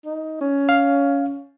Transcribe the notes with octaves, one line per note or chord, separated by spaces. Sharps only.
D#4
C#4
F5